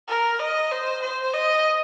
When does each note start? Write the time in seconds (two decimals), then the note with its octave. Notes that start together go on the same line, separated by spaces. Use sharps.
0.08 A#4
0.39 D#5
0.72 C5
1.02 C5
1.34 D#5